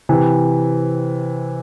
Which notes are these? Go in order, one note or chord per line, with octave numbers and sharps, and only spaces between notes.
C3 E3